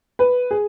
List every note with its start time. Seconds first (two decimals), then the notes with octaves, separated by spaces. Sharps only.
0.19 B4
0.51 G#4